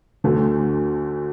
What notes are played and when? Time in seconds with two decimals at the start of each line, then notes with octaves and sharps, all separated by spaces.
0.24 D2 D3 A3